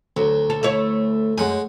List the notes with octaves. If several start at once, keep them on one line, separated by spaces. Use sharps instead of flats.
D2 F#3
A4
A3 E4 C#5
F#2 G#3 F#5 G#5